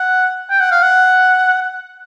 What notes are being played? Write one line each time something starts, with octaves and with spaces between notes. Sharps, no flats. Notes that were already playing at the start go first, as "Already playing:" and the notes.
Already playing: F#5
G5
F#5
F5
F#5